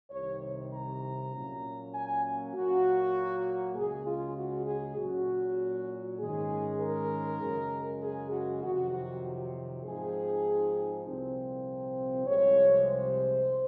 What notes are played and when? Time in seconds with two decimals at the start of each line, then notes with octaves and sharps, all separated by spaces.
0.11 C2 C3 D#3 C#5
0.73 A#5
1.33 A#2 F#3 A#3 C#4
1.94 G#5
2.54 A#2 F#3 A#3 F#4
3.76 C#2 C#3 G#3 G#4
4.07 F4
4.38 F#4
4.67 G#4
4.97 A#2 F#3 C#4 F#4
6.20 G#2 D#3 G#3 C#4 G#4
6.81 A#4
7.42 F#2 C#3 G#3
8.02 G#4
8.32 F#4
8.63 F2 C3 D#3 F#3 F#4
8.94 F#4
9.85 G#2 F3 C4 D#4 G#4
11.06 C2 A#2 F3 C4
12.27 C2 C3 F3 G#3 C#5
12.88 C5